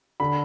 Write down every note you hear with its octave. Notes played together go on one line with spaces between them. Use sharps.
D3 B5